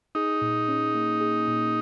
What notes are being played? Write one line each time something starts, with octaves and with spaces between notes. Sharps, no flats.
D#4 G#4
A#2
C#4
A#3
G#4
A#2